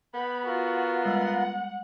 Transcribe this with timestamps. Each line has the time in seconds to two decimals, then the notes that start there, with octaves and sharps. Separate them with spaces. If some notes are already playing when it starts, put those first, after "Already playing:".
0.14 B3 G5 B5
0.46 F4 F#4 A#4
1.05 G3 G#3 F#5